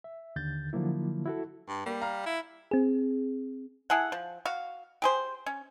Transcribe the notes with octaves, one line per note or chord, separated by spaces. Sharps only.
E5
D#2 D3 G6 A6
D3 F3 F#3 A#3 E4
E4 F#4 A4
G2
G3 A#3
F5 A#5 F6
E4
C4 G#4
E4 G#4 A4 F#5
F3
F#4 F5
G4 G#4 C5
C#4